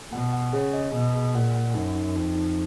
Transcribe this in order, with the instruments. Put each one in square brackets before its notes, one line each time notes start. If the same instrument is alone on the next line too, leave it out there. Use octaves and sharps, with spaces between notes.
[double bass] B2 [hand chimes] F#5
[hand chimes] F#5
[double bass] C#3 [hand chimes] G#4
[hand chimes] D#5
[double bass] B2 [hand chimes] D#5
[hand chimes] G#4
[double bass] A#2 [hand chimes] F#5
[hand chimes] F#5
[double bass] F#2 [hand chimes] D#4
[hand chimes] D#4
[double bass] F2 [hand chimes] D#4
[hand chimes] D#4